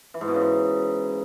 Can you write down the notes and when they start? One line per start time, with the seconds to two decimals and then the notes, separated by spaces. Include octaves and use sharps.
0.14 E3
0.21 G#2
0.28 B2
0.35 C#3
0.41 G#2